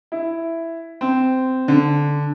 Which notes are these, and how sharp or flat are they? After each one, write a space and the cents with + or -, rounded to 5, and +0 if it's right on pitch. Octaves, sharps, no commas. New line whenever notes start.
E4 +5
C4 -15
D3 -10